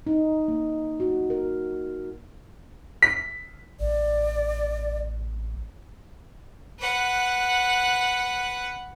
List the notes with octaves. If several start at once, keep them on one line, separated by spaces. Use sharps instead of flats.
D#4
A#3
F#4
A#4
B6
A1 D5
B4 F#5